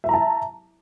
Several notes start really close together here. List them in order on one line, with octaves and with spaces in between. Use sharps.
E5 A#5 A5